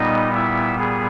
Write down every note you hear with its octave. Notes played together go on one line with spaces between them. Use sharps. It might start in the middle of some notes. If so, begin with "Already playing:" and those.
Already playing: A#2 G3 B3 D#4 D#5
E4 E5
G#4